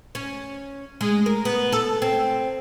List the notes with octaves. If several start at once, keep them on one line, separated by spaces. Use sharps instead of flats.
C#4
G#3
A#4
B3
A4
C4